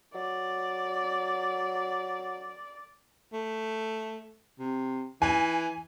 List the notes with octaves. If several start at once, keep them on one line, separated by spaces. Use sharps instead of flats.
F#3 D5
A3
C3
E3 G#5